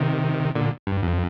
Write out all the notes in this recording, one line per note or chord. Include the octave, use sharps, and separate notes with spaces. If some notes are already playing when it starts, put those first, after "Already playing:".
Already playing: C3 D#3
A#2 D3
G2
F2